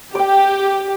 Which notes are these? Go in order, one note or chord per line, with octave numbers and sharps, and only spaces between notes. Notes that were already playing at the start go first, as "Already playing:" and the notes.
G4 D5 G5